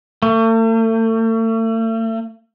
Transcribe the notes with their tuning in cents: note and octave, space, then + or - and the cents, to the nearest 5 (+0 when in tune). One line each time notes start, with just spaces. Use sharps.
A3 +40